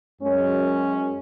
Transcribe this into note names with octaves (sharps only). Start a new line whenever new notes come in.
F#2 G#3 C#4